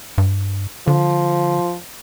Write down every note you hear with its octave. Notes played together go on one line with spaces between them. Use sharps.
G2
D3 F3